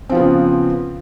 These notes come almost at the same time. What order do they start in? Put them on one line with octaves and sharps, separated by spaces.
C4 F3 F4 B3 C#3